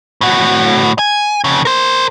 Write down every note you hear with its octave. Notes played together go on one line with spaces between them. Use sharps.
A2 F#4
G#5
F2 C#3
A#4 C5